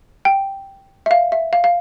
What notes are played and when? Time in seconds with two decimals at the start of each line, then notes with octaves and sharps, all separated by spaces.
0.25 G5
1.06 E5
1.11 F5
1.32 E5
1.53 F5
1.64 F5